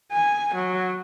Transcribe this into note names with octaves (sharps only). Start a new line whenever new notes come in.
G#5
F#3